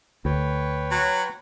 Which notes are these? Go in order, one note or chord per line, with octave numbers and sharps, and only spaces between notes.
D2 B4 C#5 G5
F#3